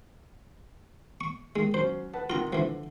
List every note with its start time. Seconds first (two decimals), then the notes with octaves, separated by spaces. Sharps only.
1.21 C#6
1.56 D#3 G#3
1.74 F#3 C#4 C5
2.13 B4 F#5 A5
2.30 C3 D#3 F4 F#5 A#5
2.53 D3 E3 F3